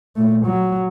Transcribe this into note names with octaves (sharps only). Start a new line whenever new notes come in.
A#2 A3
F#3